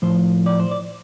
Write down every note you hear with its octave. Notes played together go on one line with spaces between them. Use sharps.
A2 F3 C5
D5
C5
D5